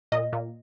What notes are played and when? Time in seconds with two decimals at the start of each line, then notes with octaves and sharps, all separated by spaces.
0.12 A#2 D#5
0.33 A#2